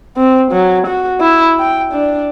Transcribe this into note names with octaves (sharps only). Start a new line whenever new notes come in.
C4
F#3
F#4
E4
G5
D4